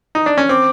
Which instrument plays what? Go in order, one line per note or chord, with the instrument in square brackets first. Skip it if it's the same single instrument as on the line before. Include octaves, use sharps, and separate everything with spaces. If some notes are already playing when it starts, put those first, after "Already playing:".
[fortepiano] D#4
D4
C#4
[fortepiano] C4 [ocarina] D6